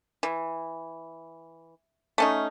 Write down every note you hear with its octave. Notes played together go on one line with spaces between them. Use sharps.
E3
A3 C#4 D#4